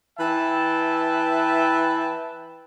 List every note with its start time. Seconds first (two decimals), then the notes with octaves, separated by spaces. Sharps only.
0.19 E3 B4 E5 G5 A5